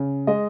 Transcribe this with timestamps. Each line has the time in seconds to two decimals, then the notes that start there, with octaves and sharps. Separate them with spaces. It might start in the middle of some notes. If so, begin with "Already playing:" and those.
Already playing: C#3
0.27 G#3 D#5